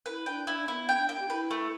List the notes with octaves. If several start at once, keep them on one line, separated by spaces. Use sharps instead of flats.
E4 B4
D4 G5
D4 E4
D4
B3 E4
G5
D4
G5
G4
E4 B4
A3